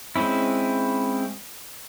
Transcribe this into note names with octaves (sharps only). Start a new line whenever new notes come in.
G#3 C4 C#4 E4